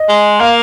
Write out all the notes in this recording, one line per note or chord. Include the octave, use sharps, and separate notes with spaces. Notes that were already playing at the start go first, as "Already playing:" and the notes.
Already playing: D#5
G#3
A#3 F5